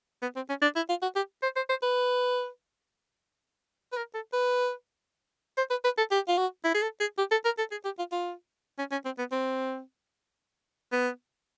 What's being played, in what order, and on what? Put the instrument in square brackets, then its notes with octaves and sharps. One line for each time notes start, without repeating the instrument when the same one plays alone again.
[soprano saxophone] B3
C4
C#4
D4
E4
F4
F#4
G4
C5
C5
C5
B4
B4
A#4
A4
B4
C5
B4
B4
A4
G4
F4
F#4
E4
G#4
A4
G#4
G4
A4
A#4
A4
G#4
G4
F4
F4
C#4
C#4
C4
B3
C4
B3